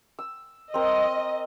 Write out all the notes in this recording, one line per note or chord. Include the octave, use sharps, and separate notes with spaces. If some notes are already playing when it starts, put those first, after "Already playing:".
E6
C4 A#4 D#5